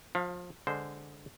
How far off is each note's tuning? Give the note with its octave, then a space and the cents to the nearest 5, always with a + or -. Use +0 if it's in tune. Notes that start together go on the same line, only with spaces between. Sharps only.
F3 +30 F5 +0
D3 -5 G#3 -15 C5 +0